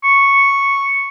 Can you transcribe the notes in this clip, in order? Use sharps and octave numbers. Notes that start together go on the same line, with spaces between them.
C#6